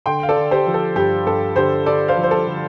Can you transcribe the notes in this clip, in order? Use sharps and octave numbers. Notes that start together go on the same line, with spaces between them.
D3 G5 C6
F5
A4 D5
D3
G4 C5
F3
A4
G2 G4
G2 A4
D3 G4 C5
D3 A4 D5
C5 F5
F3
C5
A4
D3